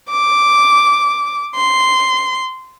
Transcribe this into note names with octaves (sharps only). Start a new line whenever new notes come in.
D6
C6